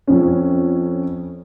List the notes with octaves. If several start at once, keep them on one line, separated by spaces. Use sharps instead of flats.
F2 C#4